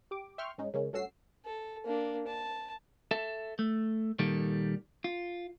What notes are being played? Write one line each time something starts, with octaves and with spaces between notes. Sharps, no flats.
G4 D6
E5 G5 C6 C#6 F6
G#2 G#3 C#4 D#4
C#3 G#3 A#3 C#4
G2 A3 C#4 F#4 E6 C7
A4
A#3 D4
A5
A4 E5 A5
A3
A#2 D#3 G3 A#3 A4
F4